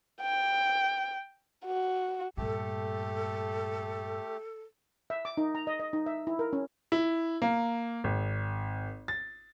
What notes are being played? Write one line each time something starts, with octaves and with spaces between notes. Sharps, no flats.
G5
F#4
G2 A#2 A3 G4 A4
E5
D6
D#4
A#5
D#5
D#5
D#4
E5
E4
A#4
C#4
E4
A#3
G#1
A6